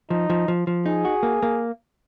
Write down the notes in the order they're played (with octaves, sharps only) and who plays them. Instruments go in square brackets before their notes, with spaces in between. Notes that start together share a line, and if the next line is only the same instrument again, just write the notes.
[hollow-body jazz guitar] F3 [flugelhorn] D#4
[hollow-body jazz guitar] F3
F3
F3
[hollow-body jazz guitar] D#4 [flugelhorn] G#4
[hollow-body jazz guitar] F#4
A#3
A#3